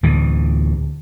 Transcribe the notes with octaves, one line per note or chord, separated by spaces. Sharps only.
D2 A2 E3